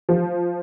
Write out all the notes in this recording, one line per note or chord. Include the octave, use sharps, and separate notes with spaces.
F3